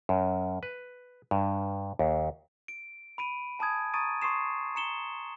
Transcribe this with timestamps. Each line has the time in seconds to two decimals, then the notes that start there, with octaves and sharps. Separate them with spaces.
0.09 F#2
0.63 B4
1.31 G2
1.99 D#2
2.68 D7
3.18 B5 D7 D#7
3.59 G#5 A5 B5 D#6 G#6
3.94 A#5 C#6 D#6 A6 D7 D#7
4.22 C6 C#6 D#6 C7 E7
4.75 A#5 C#7 E7 G7